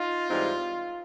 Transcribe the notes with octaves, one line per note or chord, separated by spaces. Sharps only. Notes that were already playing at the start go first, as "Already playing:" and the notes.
Already playing: D#4 F4
G#2 E3 G3 C4 D#4